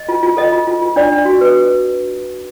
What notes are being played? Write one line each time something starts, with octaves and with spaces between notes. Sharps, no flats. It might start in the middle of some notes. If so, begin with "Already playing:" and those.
Already playing: D#5
F4
F4
A4 D#5
F4
F4
F4
D4 D5
D4
F#4
B4